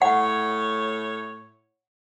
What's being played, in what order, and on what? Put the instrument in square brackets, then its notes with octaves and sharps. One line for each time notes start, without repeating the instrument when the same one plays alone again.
[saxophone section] A2 C#5 [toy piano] F#5